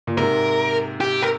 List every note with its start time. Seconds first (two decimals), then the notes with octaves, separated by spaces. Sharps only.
0.07 A#2
0.17 G#2 C3 A#4
1.01 G4
1.22 A#4